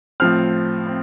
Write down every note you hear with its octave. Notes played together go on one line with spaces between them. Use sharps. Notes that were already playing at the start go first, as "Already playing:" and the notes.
A2 F3 C4 F6
C4